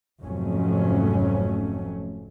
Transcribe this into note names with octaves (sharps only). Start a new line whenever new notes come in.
F1 F2 G#2 F#3 A3 C#4